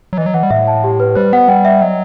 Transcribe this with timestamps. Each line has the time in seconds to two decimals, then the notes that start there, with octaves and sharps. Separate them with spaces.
0.13 F#3
0.17 E3 D#5
0.26 F#3
0.34 E3 F#5
0.43 G3
0.51 A2 E5
0.67 A5
0.84 G4
1.00 B4
1.15 G3 C5
1.33 B3 F#5
1.48 G3 G5
1.65 E5
1.81 F#3 D#5